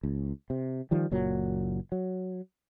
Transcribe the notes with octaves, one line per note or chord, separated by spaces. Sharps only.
C#2
C3
D#3 F3 G3
F#1 A#2 F#3
F#3